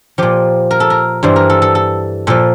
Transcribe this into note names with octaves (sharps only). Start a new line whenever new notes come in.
A#2 F3 G4
A#4
A4
A#4
G2 E3 G3 C5
A#4
A4
A4
A4
A#2 F3 A4